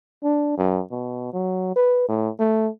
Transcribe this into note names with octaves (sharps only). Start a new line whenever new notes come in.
D4
F#2
B2
F#3
B4
A2
A3